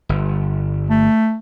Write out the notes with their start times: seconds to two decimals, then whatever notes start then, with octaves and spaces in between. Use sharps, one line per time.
0.09 G1
0.90 A3